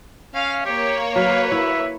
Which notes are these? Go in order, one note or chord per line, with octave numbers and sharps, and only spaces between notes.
C#4 F5
A#3 G4 C#5
F#3 B4 F5
E4 E5